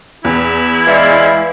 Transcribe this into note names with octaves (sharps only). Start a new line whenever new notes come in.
E2 E4
E3 G#3 D5 F5